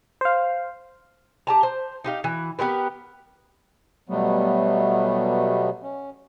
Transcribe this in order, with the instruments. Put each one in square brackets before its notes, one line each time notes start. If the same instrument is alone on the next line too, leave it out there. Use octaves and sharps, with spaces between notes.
[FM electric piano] C5 F5
[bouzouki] G4 A5 A#5
C5
D#4 G4 F5
E3 F#4
B3 G4 A#4 B4
[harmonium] B2 F#3 G3 A3 B3
C#4